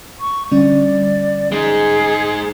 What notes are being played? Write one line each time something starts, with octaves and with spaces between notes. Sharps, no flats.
C#6
D3 G3 C#4 D5
G#3 D#4 G#4